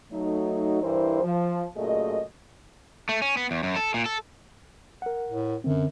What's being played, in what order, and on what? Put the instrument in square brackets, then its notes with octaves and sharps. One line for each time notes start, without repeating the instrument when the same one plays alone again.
[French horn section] F#3 A3 D#4
G2 E3 E4 A#4 C5
F3
F#2 A#2 A3 G#4 D#5
[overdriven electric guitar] A3
C#4
B3
E2
F#2
A4
A#2
A4
[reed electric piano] A#4 F#5
[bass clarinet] A2
[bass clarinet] F#2 [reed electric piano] D3 C4